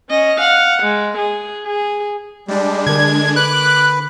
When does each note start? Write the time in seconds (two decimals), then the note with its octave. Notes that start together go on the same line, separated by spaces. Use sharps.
0.10 C#4 D#5
0.40 F5 F#5
0.83 G#3
1.18 G#4
1.67 G#4
2.48 G3 G#3 D4
2.87 D3 A#4 G#6
3.36 B4 B5 D6 F#6